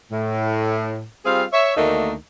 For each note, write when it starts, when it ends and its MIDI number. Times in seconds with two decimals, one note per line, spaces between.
0.12 1.05 45
1.25 1.43 55
1.25 1.43 60
1.25 1.43 65
1.25 1.43 68
1.25 1.43 77
1.53 1.76 73
1.53 1.76 76
1.76 2.13 38
1.76 2.13 51
1.76 2.13 57
1.76 2.13 58
1.76 2.13 62
1.76 2.13 63